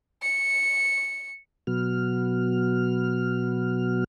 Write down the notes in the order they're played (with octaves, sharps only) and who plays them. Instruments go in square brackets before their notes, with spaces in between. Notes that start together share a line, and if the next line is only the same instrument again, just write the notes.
[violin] C#7
[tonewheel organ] B2 F#3 B3 F#4 F6